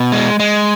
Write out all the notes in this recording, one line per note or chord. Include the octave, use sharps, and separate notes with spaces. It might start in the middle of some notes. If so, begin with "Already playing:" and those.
Already playing: B2
G#3
G#3